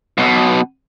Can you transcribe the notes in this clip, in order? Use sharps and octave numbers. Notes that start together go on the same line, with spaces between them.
B1 B2